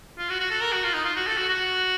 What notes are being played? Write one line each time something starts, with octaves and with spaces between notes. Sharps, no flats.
F4
F#4
F#4
A4
A#4
F#4
F4
D#4
F4
F#4
A4
F#4
F#4